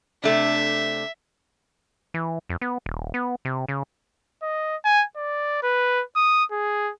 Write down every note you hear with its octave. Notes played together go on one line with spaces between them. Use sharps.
C3 A3 D4 E5
E3
F2
B3
D#1
B3
C3
C#3
D#5
G#5
D5
B4
D#6
G#4